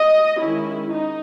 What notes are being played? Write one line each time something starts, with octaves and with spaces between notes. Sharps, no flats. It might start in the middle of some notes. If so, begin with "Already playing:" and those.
Already playing: D#5
D#3 G#3 C#4 E4
D#4